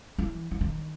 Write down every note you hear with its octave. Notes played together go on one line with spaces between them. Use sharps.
E3
E3
D#3